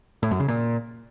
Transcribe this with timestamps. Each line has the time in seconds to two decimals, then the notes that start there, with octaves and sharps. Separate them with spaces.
0.23 A2
0.31 F#2
0.40 C#3
0.48 A#2